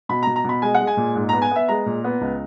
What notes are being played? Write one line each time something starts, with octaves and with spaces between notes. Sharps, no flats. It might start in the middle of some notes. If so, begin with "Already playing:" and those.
B2 B5
A#5
B2
A#5
B2 B5
G#3 G#5
F#5
G#3
G#5
A#2
G#2
B3 A#5
G#5
B3 E5
G#3 A#5
A#2
B3
C#2